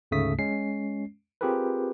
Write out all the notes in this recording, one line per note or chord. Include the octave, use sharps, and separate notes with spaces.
D2 G#2 C#3 A3 D#6 B6
G#3 C#4 C7
C4 F4 G4 G#4 A#4 B4